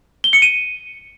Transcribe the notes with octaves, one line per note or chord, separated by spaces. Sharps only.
G7
C#7
D#7